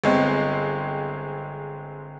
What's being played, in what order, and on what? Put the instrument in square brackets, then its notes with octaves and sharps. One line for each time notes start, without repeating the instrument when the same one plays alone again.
[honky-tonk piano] G1 G#3 C4